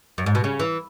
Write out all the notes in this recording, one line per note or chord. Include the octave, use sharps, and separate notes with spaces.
F#2
G#2
B2
C#3
E3